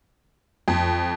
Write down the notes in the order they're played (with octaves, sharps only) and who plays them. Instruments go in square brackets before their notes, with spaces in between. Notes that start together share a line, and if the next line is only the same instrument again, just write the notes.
[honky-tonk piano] F2